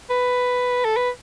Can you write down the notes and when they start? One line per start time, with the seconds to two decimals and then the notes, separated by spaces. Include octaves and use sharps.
0.10 B4
0.85 A4
0.97 B4